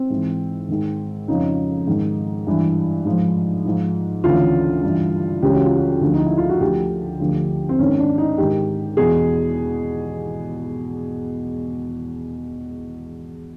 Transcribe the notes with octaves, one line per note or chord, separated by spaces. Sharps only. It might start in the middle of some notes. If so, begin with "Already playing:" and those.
Already playing: C4
G#2 E3
G#2 D#3
F2 C#3 F3 D#4
G#2 D#3
G2 E3
G#2 F3
G#2 F3
D2 C#3 E3 F4
G2 E3
C#2 C#3 E3 G4
F#4
F4
F#4
D2 D3 F3
D#4
E4
F4
F#4
D2 D3 F3 G4
D2 D3 F3
C4
G#2 D#3 C#4
D4
D#4
G#2 D#3 G4
E2 B2 G#4